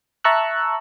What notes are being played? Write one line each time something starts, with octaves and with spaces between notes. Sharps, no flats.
E5 A5 A#5 C#6 E6 F#6